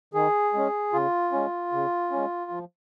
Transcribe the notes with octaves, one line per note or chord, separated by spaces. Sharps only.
D#3 G#4
G#3 C#4
C#3 F4
G#3 C#4
C#3
G#3 C#4
F3